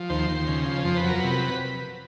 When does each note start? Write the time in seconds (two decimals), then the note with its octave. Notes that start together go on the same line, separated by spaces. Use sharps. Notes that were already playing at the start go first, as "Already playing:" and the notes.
Already playing: F3
0.10 D#2 C5
0.29 D#2
0.47 C#3
0.66 F3
0.84 F2 C5
0.97 B4
1.04 F#3 A#4
1.20 C3 B4